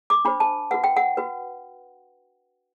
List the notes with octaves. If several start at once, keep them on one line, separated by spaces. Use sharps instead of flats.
D6
D4 F#4 C5 B5
A5
F#4 B4 F#5
G5
F#5
F#4 B4